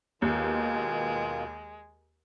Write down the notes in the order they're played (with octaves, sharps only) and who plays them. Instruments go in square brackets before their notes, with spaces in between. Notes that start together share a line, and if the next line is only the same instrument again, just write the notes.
[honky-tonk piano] D#2 [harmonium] B2 D#3 F4 [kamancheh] G#3